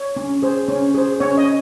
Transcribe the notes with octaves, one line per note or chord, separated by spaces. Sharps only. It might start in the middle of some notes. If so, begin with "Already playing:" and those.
Already playing: C#5
C#4
G#4 C5
C#4
G#4 C5
C#4 C#5
D#5